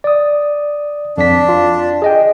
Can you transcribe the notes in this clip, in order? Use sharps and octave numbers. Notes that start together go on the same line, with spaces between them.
D5 D#6
F2 D4 B6
F4
G#4 D#5 G5